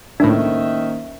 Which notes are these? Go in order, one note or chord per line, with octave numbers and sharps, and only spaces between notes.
C#2 A2 D#3 A#3 C#4 D4 C5 E5